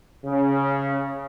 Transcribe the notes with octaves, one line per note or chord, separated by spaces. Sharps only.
C#3